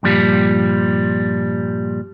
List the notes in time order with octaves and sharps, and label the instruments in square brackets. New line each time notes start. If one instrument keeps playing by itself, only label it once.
[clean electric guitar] G2 A#2 F3 G3